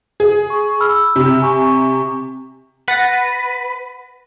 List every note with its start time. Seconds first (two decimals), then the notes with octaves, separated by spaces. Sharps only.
0.20 G#4
0.50 C#6
0.80 B5 E6 F6
1.16 C3
1.42 G#5 C#6
2.88 B4 F#5 A6 A#6